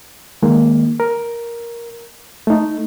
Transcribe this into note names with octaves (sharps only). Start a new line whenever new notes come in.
D#3 G#3 A#3
A#4
A3 D#4